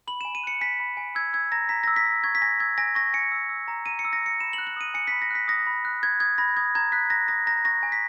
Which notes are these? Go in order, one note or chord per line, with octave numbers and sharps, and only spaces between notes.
B5 F#7
G#5 E7
D#7
F#6 C#7
G#5 B6
B5
G#5
E6 G#6
E6 G#6
A#5 A#6
A#5 B6
E6 A#6
B6
E6
C#6 G#6
B6
G#5 A#6
E6 G#6
G#5 A#6
C#6 A#6
G#5 C#7
E6
E6
A#5
A#5 D#7
C#7
E6
A#6
E6 C#7
B5 E7
F#7
F#6
F#7
D#6 D#7
G#5 C#7
B6
B5
A#6
F#6 B6
D#6 A#6
B5
F#6
B5 G#6
D#6 G#6
B5 A#6
D#6 G#6
A#5 G#6
F#6 B6
A#5 A#6
D#6 A#6
A#5 A#6
C#6 A#6
G#5
B6